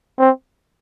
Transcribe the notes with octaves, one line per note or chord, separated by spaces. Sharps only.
C4